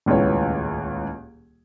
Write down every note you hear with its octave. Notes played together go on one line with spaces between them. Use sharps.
D#1 C#2 A2 B3 C#5